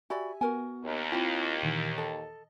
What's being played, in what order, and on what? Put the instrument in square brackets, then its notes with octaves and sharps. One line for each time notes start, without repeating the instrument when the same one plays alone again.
[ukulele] F#4 D5 B5 [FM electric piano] G4 E5 G#5
[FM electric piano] B3 [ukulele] F#4 A#4 G#5
[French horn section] D#2
[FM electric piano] C4 E4 F4 [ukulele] G5 B5
[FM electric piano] A#2 D#3 E3
[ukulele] A4 [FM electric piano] D#5